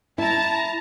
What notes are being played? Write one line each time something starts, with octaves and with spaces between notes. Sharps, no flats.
E4 A5 A#5